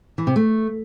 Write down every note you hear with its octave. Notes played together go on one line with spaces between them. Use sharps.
E3
C3
A3